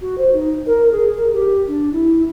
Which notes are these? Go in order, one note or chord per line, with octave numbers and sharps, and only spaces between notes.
F#4
C5
D#4
A#4
G#4
A#4
G4
D4
E4